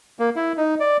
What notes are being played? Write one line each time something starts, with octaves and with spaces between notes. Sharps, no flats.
A#3
E4
D#4
D5